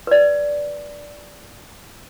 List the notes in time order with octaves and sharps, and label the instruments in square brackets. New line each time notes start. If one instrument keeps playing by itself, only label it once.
[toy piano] B4 D5